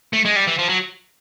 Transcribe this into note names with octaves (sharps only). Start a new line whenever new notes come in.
A3
G#3
G3
E3
F3
F#3